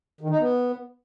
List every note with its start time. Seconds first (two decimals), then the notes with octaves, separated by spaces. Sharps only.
0.21 D#3
0.30 D#4
0.39 B3